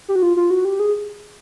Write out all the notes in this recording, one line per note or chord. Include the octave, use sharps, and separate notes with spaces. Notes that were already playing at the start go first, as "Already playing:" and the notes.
G4
F#4
F4
F4
F#4
G4
G#4